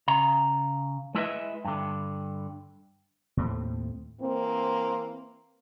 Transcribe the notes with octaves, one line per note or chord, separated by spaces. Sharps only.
C#3 A#5
G#3 E4 B4 D#5 E5
G2 D3
D#2 A2 A3 C4
E3 A#3 C4